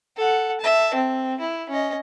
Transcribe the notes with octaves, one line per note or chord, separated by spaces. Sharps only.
A4 F#5
E5 A5
C4
E4
C#4 D#5